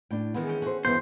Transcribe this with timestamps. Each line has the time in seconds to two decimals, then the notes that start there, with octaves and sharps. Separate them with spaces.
0.11 A2 D4 G5
0.34 D#3 E3 G#3 B3
0.47 C#4 G5
0.62 F#4 A4 C5
0.85 E2 G2 E3 B3 C5